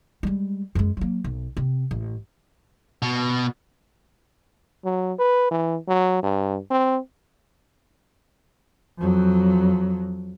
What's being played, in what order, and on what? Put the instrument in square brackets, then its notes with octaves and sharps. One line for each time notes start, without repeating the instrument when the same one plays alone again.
[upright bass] G3 G#3
F#2 G#3
F#3 A#3
B1
C3
A1
[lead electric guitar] B2
[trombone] F#3
B4
E3
F#3
G2
C4
[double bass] F2 F#3